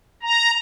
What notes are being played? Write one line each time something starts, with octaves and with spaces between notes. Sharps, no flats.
A#5